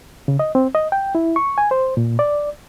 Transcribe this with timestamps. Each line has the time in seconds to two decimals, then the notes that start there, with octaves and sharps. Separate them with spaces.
0.28 C#3
0.39 D#5
0.55 C4
0.75 D#5
0.92 G5
1.15 E4
1.36 C#6
1.58 G#5
1.71 C5
1.97 A#2
2.19 D5